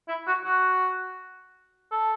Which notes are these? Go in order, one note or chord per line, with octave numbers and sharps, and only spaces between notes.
E4
F#4
F#4
A4